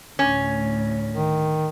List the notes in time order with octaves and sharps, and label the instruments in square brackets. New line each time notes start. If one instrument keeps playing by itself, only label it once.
[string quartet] D2 A2 [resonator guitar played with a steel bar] C#4
[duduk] D#3